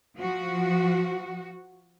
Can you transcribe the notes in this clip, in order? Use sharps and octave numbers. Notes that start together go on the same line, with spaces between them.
F3 F#4